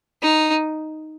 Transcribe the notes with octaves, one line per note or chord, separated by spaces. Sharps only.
D#4